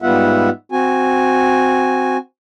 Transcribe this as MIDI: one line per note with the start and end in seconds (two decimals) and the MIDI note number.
0.02 0.50 44
0.02 0.50 55
0.02 0.50 59
0.02 0.50 65
0.02 0.50 76
0.02 0.50 78
0.72 2.17 60
0.72 2.17 66
0.72 2.17 80